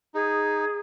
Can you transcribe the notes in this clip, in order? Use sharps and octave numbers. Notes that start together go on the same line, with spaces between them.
D#4 G#4